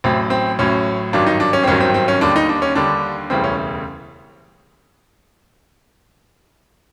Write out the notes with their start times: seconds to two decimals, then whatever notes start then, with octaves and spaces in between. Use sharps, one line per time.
0.04 A1 A2 F#3 C4
0.30 C4
0.59 A1 A2 F#3 C#4
1.13 G#1 G2 D#3 F#3 D4
1.26 D#4
1.40 D4
1.53 C#4
1.63 C4
1.67 G#1 G2 D#3 F#3 C#4
1.80 C4
1.94 C4
2.08 C#4
2.21 D#2 D3 G3 D4
2.36 D#4
2.49 D4
2.62 C#4
2.75 D#2 D3 G3 D4
3.30 E1 D2 C#3 E3 G3 C4
3.44 C#4